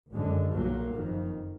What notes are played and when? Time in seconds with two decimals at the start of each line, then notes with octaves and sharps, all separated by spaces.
0.11 G#1 F#2 D3 G#3
0.53 B1 A#2 F#3 A#3
0.94 F#1 F2 D#3